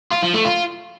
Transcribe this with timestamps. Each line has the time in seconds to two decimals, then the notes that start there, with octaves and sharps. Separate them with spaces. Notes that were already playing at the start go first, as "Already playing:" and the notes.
0.12 F4
0.23 F3
0.34 A3
0.45 F4